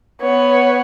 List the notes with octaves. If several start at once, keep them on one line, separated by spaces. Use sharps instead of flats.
B3 C#5